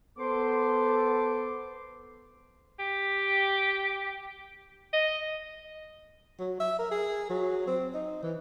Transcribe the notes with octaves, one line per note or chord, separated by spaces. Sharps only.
B3 A4 C5 C6 D6
G4
D#5
F#3
E5
A#4
G#4
F#3
C4
D#4
E3